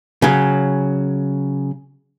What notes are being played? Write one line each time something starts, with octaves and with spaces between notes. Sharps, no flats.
C#3 F#3